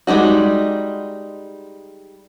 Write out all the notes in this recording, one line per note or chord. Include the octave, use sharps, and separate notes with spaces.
G3 G#3 D#4 F#4